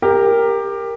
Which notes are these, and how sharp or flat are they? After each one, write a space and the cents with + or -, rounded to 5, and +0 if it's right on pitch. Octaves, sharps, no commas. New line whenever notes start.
G4 +20 A#4 +0